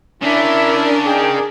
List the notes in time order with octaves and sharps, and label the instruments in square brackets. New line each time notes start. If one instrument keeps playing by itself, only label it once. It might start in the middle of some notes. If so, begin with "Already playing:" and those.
[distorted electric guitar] C#3 C#4 [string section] D4 A#4 [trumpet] E4 [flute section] E5
[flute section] D#4 G5 [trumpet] G#4